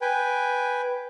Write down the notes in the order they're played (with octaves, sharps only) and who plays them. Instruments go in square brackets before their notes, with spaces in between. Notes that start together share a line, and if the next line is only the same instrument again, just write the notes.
[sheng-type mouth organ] B4 G5 G#5